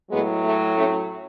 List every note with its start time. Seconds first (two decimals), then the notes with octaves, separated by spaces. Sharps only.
0.10 A2 F#3 G#3 B3
0.43 A3
0.76 A3 C#4